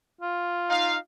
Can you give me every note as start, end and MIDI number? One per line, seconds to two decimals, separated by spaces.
0.21 0.96 65
0.70 0.97 63
0.70 0.97 77